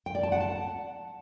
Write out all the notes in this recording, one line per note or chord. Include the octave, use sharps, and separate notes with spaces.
G5
D5
A5
F#5
A5